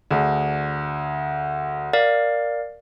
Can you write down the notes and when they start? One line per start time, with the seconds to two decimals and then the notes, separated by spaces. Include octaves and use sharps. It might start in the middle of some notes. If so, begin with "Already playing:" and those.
0.11 D2 D4 G#4
1.93 A#4 D5 F5